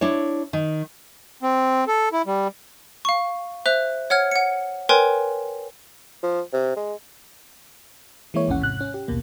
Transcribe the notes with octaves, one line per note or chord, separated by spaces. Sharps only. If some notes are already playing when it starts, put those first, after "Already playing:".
D4 E4 C#5
D#3
C4
A4
E4
G3
F5 C#6
C5 E5 F#6 F7
C#5 F#5 F6 G#6
F#5 C#7
A#4 B4 C#5 G5 G#5 C6
F3
C3
G#3
E3 G#3 A#3 E4 C#5
A1 D#2 G#2 C#4 F#5
G#2 C3 F#6
C#4
G4
A#1 D#2 B2 A#3